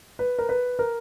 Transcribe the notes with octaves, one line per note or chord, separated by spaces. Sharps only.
B4
A#4
B4
A#4